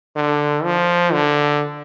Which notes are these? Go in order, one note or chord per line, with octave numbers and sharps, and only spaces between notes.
D3
F3
D3